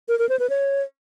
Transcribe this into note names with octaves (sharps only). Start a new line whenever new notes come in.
A#4
A#4
C5
B4
C#5